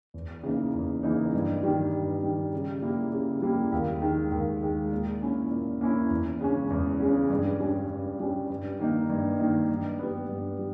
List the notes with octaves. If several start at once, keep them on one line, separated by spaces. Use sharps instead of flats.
E2
C#3 E3 A#3 D#4
E2
C#3 E3 A#3 D#4
G2
D#3 G3
G2
D#3 G3
C#3
G3 A#3 E4
C#3
G3 A#3 E4
D#2
D#3 G#3
D#2
D#3 G#3
A#2
A#3 C#4 E4
A#2
A#3 C#4 E4
E2
C#3 G#3 C#4
E2
C#3 G#3 C#4
G2
G3 C#4
G2
G3 C#4
G2
D#3 A#3 D#4
G2
D#3 A#3 D#4
G2
G3 B3
G2
G3